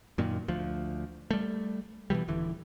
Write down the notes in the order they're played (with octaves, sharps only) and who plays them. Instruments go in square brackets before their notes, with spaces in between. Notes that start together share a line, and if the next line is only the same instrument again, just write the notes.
[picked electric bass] F#2 A#2 D#3
D2 F3
G3 A3
B2 D#3 E3 G3
D#1 D3 E3